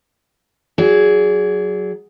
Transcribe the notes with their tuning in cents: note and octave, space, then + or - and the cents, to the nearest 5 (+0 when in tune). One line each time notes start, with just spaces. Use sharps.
F#3 +0 G#4 +0 D5 -35